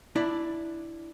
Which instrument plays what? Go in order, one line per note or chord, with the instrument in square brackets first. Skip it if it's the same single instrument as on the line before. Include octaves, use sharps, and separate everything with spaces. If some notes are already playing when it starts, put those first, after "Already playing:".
[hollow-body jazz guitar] D4 E4 D5